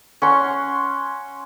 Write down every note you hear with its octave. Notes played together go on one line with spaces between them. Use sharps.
C#4 F#5 C6